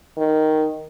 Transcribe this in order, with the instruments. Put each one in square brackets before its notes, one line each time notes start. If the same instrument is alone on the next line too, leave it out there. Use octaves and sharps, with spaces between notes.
[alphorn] D#3